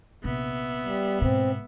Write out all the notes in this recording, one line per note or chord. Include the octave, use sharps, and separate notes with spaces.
A#1 C3 B3 E5
G3
G#2 B2 C4